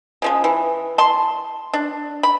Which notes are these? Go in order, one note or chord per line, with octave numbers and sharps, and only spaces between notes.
C#3 F3 G#3
E3
A5 C6
D4
B5